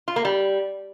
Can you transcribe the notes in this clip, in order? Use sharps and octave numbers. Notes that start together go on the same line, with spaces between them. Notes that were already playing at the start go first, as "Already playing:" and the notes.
F4
A#3
G3